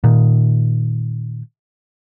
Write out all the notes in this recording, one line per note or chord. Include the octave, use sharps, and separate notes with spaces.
A#2 D#3